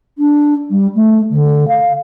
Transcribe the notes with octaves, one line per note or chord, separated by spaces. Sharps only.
D4
G3
A3
D3
F5